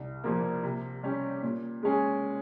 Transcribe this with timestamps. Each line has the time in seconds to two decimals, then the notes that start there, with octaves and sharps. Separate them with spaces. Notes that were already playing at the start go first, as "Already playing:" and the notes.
Already playing: C2
0.24 A#2 F3 A#3
0.63 C3
1.03 G3 C#4 G4
1.43 A#2
1.83 G#3 C#4 G#4